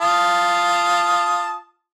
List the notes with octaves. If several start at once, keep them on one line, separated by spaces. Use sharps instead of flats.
F4 A5 D#6